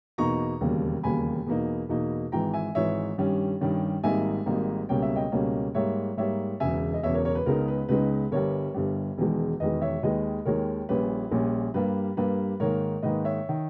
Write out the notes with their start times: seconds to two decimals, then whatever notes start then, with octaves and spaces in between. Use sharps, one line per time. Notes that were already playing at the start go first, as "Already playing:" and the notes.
0.18 E2 B2 A#3 D#4 A#5 C#6
0.61 E1 D#2 C#3 G3 A#3
1.03 E1 D#2 C#3 G3 A#3 G#5 B5
1.47 E2 B2 A#3 D#4
1.89 E2 B2 A#3 D#4
2.32 G#1 G#2 E3 G5 A#5
2.54 E5 G#5
2.75 G#1 G#2 E3 C#5 E5
3.18 G2 D#3 G3 C#4
3.61 G2 D#3 G3 C#4
4.03 G#1 G#2 G3 A#3 D#4 E5 G#5
4.46 G#1 G#2 G3 A#3 D#4
4.89 C#2 B2 G3 A#3 C#4 G5
5.02 E5
5.16 D#5 G5
5.32 C#2 B2 G3 A#3 C#4
5.74 G#2 G3 A#3 C#5 E5
6.17 G#2 G3 A#3 C#5 E5
6.60 E1 E2 C#3 E5 G#5
6.94 D#5
7.03 E1 E2 C#3 C#5 E5
7.14 A#4 C#5
7.25 A#4 C#5
7.35 B4
7.46 C#2 C#3 G#3 B3 D#4 A#4
7.68 B4
7.88 C#2 C#3 G#3 B3 D#4 B4
8.32 G1 G2 G3 A#4 C#5
8.74 G1 G2 G3
9.18 E1 E2 D#3 G#3
9.60 E1 E2 D#3 G#3 B4 D#5
9.82 C#5 E5
10.03 D#2 D#3 G#3 B4 D#5
10.45 D#2 D#3 G#3 A#4 C#5
10.89 A#1 A#2 G3 C#4 B4
11.31 A#1 A#2 G3 C#4
11.74 G2 G3 A#3 B4
12.17 G2 G3 A#3 B4
12.60 G#2 D#3 A#3 A#4 C#5
13.02 G#2 D#3 A#3 B4 D#5
13.25 C#5 E5
13.49 D#3